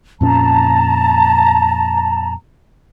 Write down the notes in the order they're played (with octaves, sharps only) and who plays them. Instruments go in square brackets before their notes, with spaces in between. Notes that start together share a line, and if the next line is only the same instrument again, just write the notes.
[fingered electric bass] F2 A#2 C#4 [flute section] A5 A#5